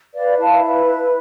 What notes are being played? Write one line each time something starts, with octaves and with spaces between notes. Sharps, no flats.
B4 D5 F5
E4 F5 A5
B4
E4